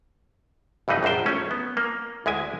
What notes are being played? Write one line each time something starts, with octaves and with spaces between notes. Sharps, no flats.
C2 G2 E3 D#4 B4
A#1 F#2 F4 C5 G5
A3 C#4
B3
A#3
D2 G#3 E4 G#5